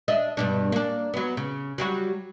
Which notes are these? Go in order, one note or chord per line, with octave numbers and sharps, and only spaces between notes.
D4 D#5 E5
G2 B2 D4
A#3 D4
F#3 B3
C#3
F#3 G3 F#4